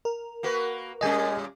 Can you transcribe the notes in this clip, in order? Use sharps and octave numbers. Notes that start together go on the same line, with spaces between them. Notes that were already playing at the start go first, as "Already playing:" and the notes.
A#4
A#3 F#4 B4
A#2 G3 C#4 D#5 G#5